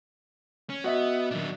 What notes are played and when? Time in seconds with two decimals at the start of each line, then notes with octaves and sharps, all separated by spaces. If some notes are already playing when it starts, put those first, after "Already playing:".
0.70 C#4
0.84 B3 F#4 D#5 E5
1.31 A#2 D#3 F#3 D4